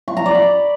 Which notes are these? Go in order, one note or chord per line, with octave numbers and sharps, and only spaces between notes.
C#6
A#5
D5
B5